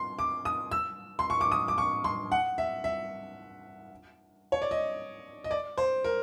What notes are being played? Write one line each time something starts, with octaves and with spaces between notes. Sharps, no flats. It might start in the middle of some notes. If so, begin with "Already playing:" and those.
Already playing: C6
D6
D#6
E6
C6
C#6
D6
D#6
D6
C#6
C6
F#5
E5
E5
C#5
D5
D#5
D#5
D5
C5
A#4